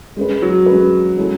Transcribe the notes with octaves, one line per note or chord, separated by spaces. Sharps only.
G#3 C#4 G#4 B4
F#3
G#3 C#4 G#4 B4
G#3 C#4 E4 A4